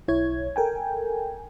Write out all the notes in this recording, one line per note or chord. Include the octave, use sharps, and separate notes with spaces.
B1 E4 C#5 G#6
A4 A#4 G5 G#5